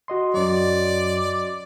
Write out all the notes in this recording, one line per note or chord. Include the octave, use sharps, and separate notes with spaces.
F#4 D#5 C6
F#2 F#3 D5